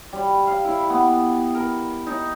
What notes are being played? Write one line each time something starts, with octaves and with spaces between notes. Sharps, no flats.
G3
F5
E4
B3
A#4
D#4